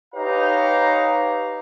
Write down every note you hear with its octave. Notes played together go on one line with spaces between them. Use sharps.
D#4 G4 B4 C#5 F5 A#5